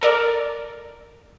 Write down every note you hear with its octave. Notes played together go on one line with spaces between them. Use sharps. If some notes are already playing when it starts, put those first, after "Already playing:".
A4 A#4 D5